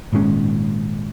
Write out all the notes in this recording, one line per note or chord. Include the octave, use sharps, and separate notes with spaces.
G#1 A#2 G#3 C#4